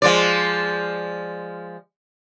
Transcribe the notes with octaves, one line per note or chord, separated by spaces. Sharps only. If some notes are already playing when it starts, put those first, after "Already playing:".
F3 G#3 D5